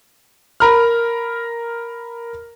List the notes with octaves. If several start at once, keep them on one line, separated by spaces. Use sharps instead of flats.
A#4 A#5 B5 F6